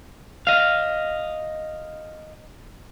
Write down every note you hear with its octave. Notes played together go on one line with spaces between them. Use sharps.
D#5 F5